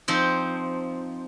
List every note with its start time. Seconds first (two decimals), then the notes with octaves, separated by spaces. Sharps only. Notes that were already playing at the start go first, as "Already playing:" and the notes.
0.08 F3 C4 D#4